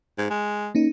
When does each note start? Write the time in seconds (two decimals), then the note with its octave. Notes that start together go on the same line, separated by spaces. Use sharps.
0.18 G#2
0.30 G#3
0.75 A#3 C#4 D#4